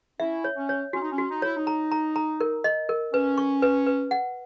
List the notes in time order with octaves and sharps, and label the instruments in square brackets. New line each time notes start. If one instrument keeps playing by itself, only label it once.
[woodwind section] C#4 E4 [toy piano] E5
[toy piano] C#5
[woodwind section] C#4
[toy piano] C#5
[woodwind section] C#4 [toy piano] F#4
[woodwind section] D#4
C#4
[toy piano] F#4
[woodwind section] D#4
[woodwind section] E4 [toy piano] C#5
[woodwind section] D#4
[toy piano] A#5
A#5
A#5
A#4
D#5
A#4
[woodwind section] C#4 [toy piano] B4
[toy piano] C#6
B4
B4
F#5